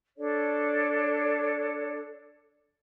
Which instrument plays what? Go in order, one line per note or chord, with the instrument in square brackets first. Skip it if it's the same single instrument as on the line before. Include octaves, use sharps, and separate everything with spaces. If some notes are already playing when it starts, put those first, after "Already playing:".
[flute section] D4 A4 C#5 D5